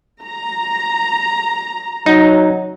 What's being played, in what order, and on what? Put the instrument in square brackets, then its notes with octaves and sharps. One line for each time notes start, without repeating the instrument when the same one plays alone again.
[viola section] A#5
[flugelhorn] F#3 [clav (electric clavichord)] D#4